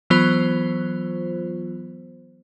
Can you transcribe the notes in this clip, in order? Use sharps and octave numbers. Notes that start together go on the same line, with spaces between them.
E3 F#3 B3 F4 C5